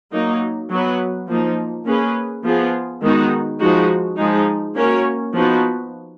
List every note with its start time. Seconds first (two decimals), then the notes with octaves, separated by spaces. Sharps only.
0.12 F#3 A#3 D#4
0.70 F#3 B3 F#4 B4
1.28 F3 A#3 D#4
1.86 A#3 C#4 G#4 B4
2.44 F3 B3 F4 G#4
3.02 D#3 G#3 B3 D#4 F#4
3.60 F3 G#3 D#4 F#4
4.17 F3 G#3 D#4
4.75 A#3 C#4 F#4 A#4 C#5
5.33 F3 B3 D#4 F#4 B4